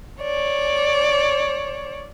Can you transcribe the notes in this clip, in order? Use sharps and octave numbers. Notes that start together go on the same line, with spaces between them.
C#5 D5